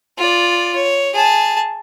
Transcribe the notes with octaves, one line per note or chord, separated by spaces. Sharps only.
F4 D5
C#5
G#4 A5